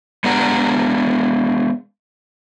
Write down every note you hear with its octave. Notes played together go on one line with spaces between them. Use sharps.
G#3 B3 D4 G4 F#5 A#5